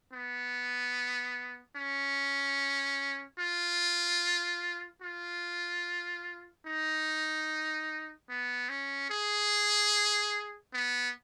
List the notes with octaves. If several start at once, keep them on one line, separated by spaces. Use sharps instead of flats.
B3
C#4
F4
F4
D#4
B3
C#4
G#4
B3